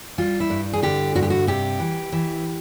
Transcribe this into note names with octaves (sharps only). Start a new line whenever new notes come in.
G3 F4
E4
G2
G#4
D3 G4
G2 F#4
G4
F#4
C3 G4
E3
E3